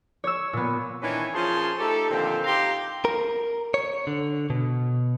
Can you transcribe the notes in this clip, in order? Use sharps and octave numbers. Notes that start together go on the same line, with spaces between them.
C#5 E6
A#2 B3
D#3 E3 C#4 D4 B4 C#5
F3 C#4 G#4 A#4 A5 C6
A3 D#4 G4 A4
A#2 D3 D#3 F3 C4
D#4 G4 F5 G5 A#5 C6
A#4
C#5
D3
B2